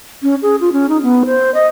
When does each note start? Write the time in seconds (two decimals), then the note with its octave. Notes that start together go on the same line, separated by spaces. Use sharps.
0.22 C#4
0.42 G#4
0.61 F4
0.72 C#4
0.89 D#4
1.03 B3
1.26 C5
1.54 D#5